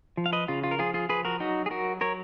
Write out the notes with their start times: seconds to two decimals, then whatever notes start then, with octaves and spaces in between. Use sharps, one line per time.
0.17 F3
0.26 F5
0.33 B4 D#5
0.48 C#3 F4
0.64 F4
0.71 A#4
0.79 F3 F4 G#4
0.94 F4 G#4
1.09 F3 G#4 B4
1.25 F#4 A#4
1.40 F#3 D#4 F#4
1.66 G#4
1.70 F#3 F#4 A#4
2.01 F#3 A#4 C#5